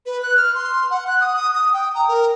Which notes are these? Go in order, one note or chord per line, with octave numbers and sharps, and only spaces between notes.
B4
F#6
F6
C6
F#5
F#6
D#6
D#6
D#6
G5
A#5
A#4